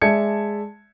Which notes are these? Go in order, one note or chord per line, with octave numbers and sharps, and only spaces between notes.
G#3 D5 E5 A5 G#6 C#7